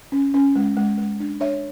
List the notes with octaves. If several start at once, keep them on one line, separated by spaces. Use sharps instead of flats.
C#4
C#4
G#3
G#3
G#3
D4
D4 C#5 E5